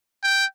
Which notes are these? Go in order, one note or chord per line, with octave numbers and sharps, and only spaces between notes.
G5